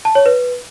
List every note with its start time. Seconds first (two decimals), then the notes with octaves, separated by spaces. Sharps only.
0.05 A5
0.15 C#5
0.26 B4